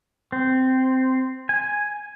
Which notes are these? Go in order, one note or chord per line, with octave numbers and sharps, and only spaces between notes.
C4
G#5